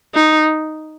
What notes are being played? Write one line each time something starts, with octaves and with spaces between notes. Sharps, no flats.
D#4